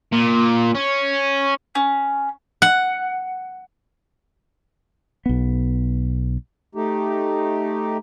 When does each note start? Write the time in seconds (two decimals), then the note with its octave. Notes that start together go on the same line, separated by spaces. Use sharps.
0.13 A#2
0.75 C#4
1.75 C#4
2.62 F#5
5.26 B1 B3
6.75 A3 D#4 G4